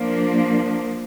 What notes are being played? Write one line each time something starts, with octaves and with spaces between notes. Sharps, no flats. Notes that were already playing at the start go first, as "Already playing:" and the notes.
Already playing: F3 A#3 D4